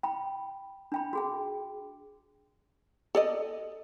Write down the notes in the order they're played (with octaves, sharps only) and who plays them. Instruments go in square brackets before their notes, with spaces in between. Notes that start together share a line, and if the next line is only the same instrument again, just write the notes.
[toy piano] G5 B5
D4 G5 B5
F#4 G#4 G5
[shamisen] A4 D5 D#5